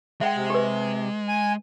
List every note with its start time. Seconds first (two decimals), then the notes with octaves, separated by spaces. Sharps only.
0.21 G#3 E5 F#5 G5
0.35 C3
0.50 G4 B4
1.28 G#5